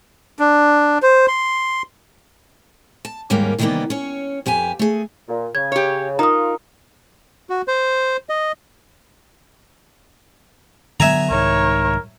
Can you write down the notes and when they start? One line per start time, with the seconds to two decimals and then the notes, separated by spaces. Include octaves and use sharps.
0.39 D4
1.02 C5
1.28 C6
3.05 A5
3.30 D#2 G#2 G3 A#3 C#4 A#4
3.59 C3 D#3 E3 G3 A#3 B3
3.90 C#4 C#5
4.46 F2 G4 B4 G#5
4.79 A3 G#4
5.29 A#2
5.55 C#3 G#6
5.72 G4 C#5
6.19 D#4 F4 A#4 A#5 D#6
7.50 F#4
7.68 C5
8.29 D#5
11.00 D3 F#3 B3 E5 G#5 A#5
11.30 C2 G#2 D#3 A#4 C#5